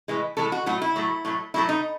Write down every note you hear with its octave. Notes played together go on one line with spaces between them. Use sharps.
A2 E3 G#3
A2 E3 G#3 A4
F#4
A2 F#3 A3 F#4
E4
A2 F#3 A3
A2 F#3 A3
A2 F#3 A3 E4
D#4